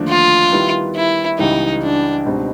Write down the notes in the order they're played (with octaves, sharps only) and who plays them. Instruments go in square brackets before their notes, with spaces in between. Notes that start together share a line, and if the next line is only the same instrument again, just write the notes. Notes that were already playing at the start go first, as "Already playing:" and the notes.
Already playing: [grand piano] D#2 D3 F3 A3 D4
[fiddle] F4
[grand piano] D#3 G3 B3 E4
[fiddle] E4
[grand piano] C#2 C#3 E3 G3 [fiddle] D#4
[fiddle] D4
[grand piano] C#2 B2 G3 C4 D#4